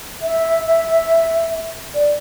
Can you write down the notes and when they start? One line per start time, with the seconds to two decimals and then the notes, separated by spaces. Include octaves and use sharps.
0.22 E5
1.95 D5